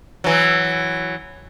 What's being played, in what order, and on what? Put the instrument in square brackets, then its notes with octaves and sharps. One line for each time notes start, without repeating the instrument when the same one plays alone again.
[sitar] E3 F#3